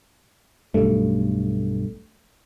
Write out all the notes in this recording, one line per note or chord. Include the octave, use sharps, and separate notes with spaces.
B1 G2 A3